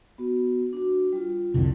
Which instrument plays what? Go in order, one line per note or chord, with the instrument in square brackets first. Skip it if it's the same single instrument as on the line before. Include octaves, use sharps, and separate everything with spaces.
[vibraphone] B3 F#4
D4 F#4
G3 F4
[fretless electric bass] C2 F2 D3